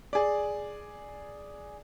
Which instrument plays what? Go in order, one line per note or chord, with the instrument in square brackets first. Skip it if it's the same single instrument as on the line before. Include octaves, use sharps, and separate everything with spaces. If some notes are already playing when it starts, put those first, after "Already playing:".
[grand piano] G#4 D5